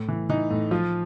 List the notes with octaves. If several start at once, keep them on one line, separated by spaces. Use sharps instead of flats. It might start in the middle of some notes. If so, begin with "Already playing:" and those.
Already playing: A2
E3
E3 D#4
A2
F3 F4